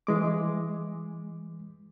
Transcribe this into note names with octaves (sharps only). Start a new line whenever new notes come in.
E3 G#3 D6